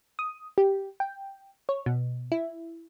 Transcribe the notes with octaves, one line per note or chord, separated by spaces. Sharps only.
D#6
G4
G5
C#5
B2
E4